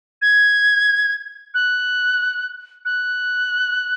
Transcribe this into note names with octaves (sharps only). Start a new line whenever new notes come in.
G#6
F#6
F#6